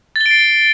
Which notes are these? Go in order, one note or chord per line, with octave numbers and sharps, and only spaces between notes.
A6
G7
D7
C7